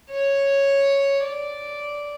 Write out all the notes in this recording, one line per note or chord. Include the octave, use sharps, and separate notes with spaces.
C#5
D5